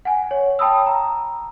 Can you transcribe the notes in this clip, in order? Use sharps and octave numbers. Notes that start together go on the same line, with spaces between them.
F#5 G#5
C#5
G5 A5 B5 D#6 E6
A#5